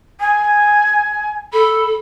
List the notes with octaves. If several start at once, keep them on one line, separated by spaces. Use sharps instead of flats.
G#5
A4 B5